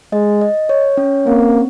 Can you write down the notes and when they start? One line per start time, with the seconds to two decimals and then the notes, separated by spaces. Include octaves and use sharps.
0.12 G#3 D#5
0.41 D#5
0.69 C#5
0.97 C#4
1.26 A#3 C4